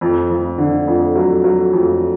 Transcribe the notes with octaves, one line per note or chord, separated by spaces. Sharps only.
F2
F2
D3
F2
F#3
F#3
F2